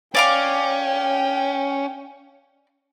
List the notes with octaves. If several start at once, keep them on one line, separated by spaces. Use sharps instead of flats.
C#4 D5 F5 G5 D6